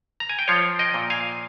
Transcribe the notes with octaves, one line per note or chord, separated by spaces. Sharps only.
A#5
G#5
G5
F3 C#5 F5
D#5 G5
A#2
F5 G#5